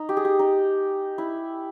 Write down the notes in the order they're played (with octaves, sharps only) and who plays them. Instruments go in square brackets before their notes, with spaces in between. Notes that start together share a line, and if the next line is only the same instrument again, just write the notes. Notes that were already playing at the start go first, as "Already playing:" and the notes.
Already playing: [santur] D#4
G4
G#4
G4
D#4
E4